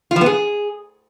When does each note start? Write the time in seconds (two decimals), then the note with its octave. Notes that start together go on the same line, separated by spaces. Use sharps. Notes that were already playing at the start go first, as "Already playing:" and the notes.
0.11 F4
0.16 F3
0.21 B3
0.26 G#4